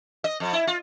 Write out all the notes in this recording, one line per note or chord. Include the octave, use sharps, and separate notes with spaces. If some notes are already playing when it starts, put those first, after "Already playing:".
D#5
F2
E4
F4